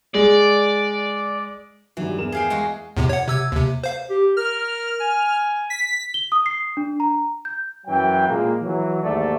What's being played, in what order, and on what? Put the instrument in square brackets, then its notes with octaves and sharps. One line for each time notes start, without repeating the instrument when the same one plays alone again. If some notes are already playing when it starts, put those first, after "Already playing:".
[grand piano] G#3 [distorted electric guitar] D5
[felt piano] G2 D#3 F#3 [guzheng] E3
[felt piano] E2 A#4 E7
[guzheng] G#4 F5 G5
G#3 F#4
[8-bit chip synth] E2 A2 C3
C#5 F#5
C3 E6 G#6
D#2 C3
C5 F5
[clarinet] G4
[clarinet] A#4 [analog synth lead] F6
[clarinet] G#5
[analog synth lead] B6
[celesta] G7
D#6
C7
D4
A#5
G6
[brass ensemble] F#2 E3 F#3 G5
A#2 G#3 A#3
E3 F#3
D#2 G#2 A3 D5 E5